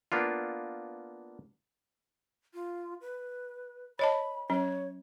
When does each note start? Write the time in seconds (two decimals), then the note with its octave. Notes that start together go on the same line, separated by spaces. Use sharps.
0.12 A#3 B3 D4 F4
2.54 F4
3.01 B4
3.99 C#5 D#5 A5 B5
4.50 F#3 C#4 C#5